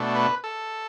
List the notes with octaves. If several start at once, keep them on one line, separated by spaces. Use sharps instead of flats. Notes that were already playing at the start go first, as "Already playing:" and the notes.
Already playing: B2 A3 D4
B4
A4